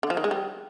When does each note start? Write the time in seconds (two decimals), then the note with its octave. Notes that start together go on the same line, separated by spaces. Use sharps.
0.03 D3
0.10 F3
0.17 D#3
0.24 G#3
0.31 G3